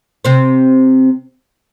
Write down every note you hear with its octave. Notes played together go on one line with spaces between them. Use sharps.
C3 C4